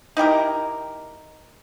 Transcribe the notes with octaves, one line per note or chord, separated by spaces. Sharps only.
D#4 E4 G4 A#4